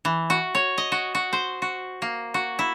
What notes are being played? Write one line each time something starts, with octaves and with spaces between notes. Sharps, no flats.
E3
F#4
C#5
D#5
F#4
F#4
C5
F#4
A#3
F#4
E4